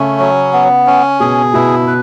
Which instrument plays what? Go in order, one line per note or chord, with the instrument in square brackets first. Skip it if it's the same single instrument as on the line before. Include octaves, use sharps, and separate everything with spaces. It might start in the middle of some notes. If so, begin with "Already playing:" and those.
Already playing: [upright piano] C#3 [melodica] A3 C#4
[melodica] F#3
B3
C#4
[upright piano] B2 [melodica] G#4
[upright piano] B2 [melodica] E4
[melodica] B4